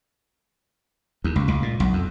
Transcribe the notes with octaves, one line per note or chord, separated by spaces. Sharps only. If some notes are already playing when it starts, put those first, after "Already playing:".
D#2
C#2
C#2
A#2
B1
F2